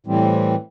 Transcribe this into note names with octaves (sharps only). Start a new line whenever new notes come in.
A2 E3 G3 C4